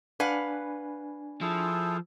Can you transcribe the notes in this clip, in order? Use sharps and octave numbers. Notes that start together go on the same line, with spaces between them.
D4 B4 F5 F#5 G#5
F3 E4 G#4 A4